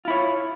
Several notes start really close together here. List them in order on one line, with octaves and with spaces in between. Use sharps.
F4 E4 C#5